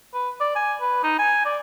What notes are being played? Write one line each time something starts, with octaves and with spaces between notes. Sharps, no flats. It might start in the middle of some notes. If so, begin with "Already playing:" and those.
B4
D5
G#5
B4
D#4
G#5
D5